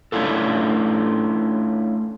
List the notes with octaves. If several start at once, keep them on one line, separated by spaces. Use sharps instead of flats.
A3 C#4 D4 E4 F4 A4